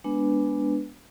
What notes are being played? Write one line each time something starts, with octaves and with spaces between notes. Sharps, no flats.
G#3 B3 D4 B4